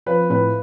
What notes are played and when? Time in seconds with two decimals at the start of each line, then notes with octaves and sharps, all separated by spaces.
0.06 F3 B4
0.30 A2 B4